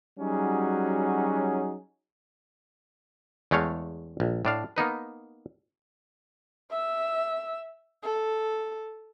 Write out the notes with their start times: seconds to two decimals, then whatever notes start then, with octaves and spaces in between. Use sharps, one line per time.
0.19 F#3 G3 C#4 D#4 F#4 G#4
3.51 E2 G#3 A3 C#5 F5
4.20 A#1
4.45 A2 D4 F5
4.76 A#3 B3 D#4 B4
6.70 E5 E6
8.03 A4